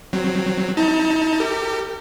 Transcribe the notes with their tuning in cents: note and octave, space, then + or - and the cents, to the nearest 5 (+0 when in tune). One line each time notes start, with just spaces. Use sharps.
F#3 +0 C4 +0
D#4 +40 A5 +30
G4 +0 A#4 -45